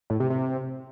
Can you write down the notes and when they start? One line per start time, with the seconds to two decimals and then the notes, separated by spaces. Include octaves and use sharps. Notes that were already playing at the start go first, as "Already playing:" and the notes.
0.10 A2
0.20 C3
0.30 C3